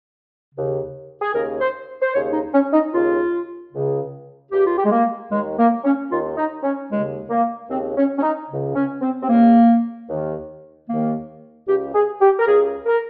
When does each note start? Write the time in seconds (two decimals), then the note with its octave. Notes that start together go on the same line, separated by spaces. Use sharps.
0.54 D#2 C#3
1.21 G#4
1.33 D#2 C#3 A#4
1.60 C5
2.01 C5
2.13 D#2 C#3 C#5
2.32 D#4
2.53 C#4
2.72 D#4
2.92 D#2 C#3 F4
3.72 C#2 C#3
4.51 C#2 C#3 G4
4.64 F4
4.77 G4
4.85 G#3
4.91 A#3
5.30 D#2 D#3 G#3
5.57 A#3
5.84 C#4
6.10 D#2 D#3 F4
6.36 D#4
6.63 C#4
6.90 D#2 C#3 G#3
7.30 A#3
7.70 D#2 C#3 C4
7.96 C#4
8.17 C#4
8.22 D#4
8.49 C#2 C#3
8.75 C#4
9.01 C4
9.21 C4
9.28 C#2 C#3 A#3
10.08 D#2 D#3
10.87 D#2 D#3 A#3
11.67 C#2 C#3 G4
11.93 G#4
12.20 G4
12.38 A#4
12.46 C#2 C#3 G#4
12.86 A#4